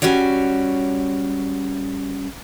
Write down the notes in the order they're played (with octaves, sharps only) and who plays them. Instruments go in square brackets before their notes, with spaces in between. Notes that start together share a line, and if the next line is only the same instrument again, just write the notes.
[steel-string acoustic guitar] G3 C#4 F#4 C#5 D5